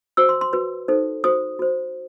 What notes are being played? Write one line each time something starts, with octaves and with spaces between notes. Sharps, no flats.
F#4 C5 E6
C6
C6
F#4 B4
D#4 A4 C5
F#4 C5 D#6
F#4 C5